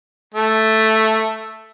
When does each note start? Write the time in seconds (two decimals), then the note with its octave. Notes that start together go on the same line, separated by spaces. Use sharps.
0.34 A3